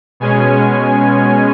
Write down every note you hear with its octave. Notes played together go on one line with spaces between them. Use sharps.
B2 G#3 C#4 G#5